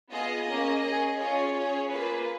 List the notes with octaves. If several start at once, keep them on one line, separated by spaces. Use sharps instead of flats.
B3 F4 G#4 D#5
A#3 C#4 G#4
C#4 G#4
C#4 F4 G#4 C#5
C#4 G#4
A#3 F4 G#4 B4